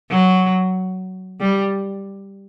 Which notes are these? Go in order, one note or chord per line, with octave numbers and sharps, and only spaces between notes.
F#3
G3